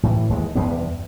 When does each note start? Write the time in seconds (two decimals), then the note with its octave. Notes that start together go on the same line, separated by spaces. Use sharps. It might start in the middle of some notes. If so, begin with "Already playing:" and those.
0.03 A2 E3
0.29 D#2 E3 G#3
0.55 E2 G2 C3 B3